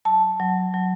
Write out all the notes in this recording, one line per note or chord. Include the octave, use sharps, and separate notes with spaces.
F#3 A5
F#3
F#3